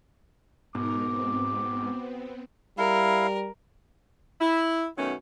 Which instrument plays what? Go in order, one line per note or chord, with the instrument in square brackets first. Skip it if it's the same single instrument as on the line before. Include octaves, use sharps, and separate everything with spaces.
[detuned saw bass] G#2 [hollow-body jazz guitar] B2 [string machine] D#4 A#4 [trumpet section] D6
[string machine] B3 C4
[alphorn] G3 [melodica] E4 F5 [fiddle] A#4
[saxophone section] E4
B2 D#3 F#3 A3 B3 C#4